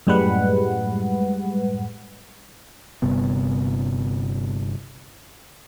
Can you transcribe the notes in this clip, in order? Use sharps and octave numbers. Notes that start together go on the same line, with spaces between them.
F#2 A2 G3 G#3 B4 F#5
G1 G2 C3 B3